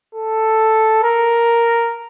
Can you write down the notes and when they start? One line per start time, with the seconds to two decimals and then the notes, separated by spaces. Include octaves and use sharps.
0.15 A4
1.04 A#4